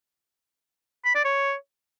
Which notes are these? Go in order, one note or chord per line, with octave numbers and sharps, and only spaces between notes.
B5
D5
C#5